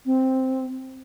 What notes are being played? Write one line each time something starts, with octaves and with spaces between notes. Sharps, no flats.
C4